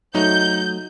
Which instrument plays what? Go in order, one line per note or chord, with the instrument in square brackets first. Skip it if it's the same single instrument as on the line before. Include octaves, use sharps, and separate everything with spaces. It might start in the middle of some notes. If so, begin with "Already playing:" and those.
[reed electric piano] F#3 A3 [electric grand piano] D#4 [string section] G6